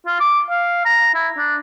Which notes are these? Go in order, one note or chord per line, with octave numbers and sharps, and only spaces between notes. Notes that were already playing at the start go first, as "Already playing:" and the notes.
F4
D6
F5
A#5
E4
D4